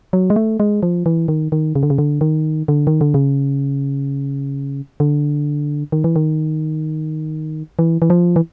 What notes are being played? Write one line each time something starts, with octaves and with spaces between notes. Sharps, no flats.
F#3
G#3
A3
G#3
F3
E3
D#3
D#3
C#3
D3
C#3
D3
D#3
D3
D#3
D3
C#3
D3
D#3
E3
D#3
E3
E3
F3
E3